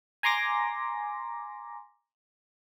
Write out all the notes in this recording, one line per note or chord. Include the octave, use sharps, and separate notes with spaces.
G#5 A#5 C6 D6 A#6